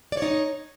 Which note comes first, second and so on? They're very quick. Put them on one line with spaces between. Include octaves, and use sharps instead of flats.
D5 C#5 D#4